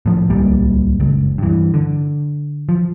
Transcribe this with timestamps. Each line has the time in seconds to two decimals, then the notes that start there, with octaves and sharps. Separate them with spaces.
0.06 A2 F3
0.30 D1 C2 G3 A#3
1.00 F#1 C#2
1.38 G2 E3
1.74 D3
2.69 F3